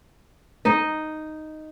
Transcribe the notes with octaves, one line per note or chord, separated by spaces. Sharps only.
D#4 D#5